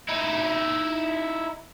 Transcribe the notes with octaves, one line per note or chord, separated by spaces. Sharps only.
D#4 E4